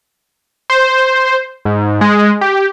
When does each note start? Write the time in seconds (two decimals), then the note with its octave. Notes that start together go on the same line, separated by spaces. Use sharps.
0.70 C5
1.65 G#2
2.01 G#3
2.41 G4